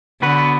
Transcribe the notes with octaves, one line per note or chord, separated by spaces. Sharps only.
D3 B3 F#4 B4